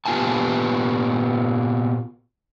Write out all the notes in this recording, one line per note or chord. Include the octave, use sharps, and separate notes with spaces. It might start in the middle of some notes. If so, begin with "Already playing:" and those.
A#2 B3 F4 G4 G#5 A5